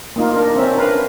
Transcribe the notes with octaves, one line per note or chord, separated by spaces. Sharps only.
A#3 D#4 F4
D4 A#4
C4 C#4 E5
D4 A#4 B4 F5